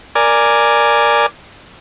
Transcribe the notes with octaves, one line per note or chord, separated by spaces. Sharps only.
A#4 D5 G#5